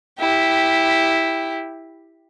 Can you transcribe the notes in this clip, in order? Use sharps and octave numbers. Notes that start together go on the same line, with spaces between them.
E4 G4